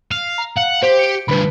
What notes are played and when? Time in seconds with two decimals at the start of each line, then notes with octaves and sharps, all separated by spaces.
0.11 F5
0.38 A#5
0.57 F5 F#5
0.82 G4 C5
0.99 C#7 D7
1.28 D2 G2 B4 B5